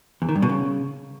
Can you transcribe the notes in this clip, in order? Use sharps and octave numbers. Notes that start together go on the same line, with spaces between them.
E2
D#3
G2
B2
C#3